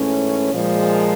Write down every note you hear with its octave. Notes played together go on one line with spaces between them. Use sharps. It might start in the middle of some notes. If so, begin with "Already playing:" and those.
Already playing: G#2 E3 A3 C#4
A#2 F3 G#3